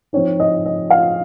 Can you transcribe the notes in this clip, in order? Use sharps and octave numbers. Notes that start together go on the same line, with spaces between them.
F3 C4 D#4 C#5
D#5
D#5
F5